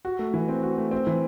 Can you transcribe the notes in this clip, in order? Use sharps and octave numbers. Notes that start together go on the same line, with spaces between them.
F#4
A3
E3
C4
F#4
A3
C4
E3